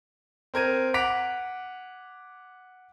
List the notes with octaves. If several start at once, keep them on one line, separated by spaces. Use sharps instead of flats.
C4 A#4 G#6 D#7
F#5 D6 F#6 B6 D7 F7